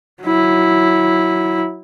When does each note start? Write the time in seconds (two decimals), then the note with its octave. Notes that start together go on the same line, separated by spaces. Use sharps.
0.23 F#3 E4